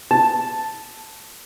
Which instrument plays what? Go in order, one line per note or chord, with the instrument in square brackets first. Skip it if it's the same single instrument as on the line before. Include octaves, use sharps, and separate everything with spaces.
[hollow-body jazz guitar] A5